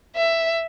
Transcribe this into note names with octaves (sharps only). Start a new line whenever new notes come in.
E5